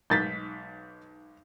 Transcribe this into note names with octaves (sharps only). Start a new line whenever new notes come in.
B1 G#2 G6 A6 B6